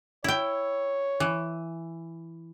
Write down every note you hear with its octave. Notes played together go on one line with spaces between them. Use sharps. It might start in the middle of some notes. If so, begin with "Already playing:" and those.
E4 C#5 G5
E3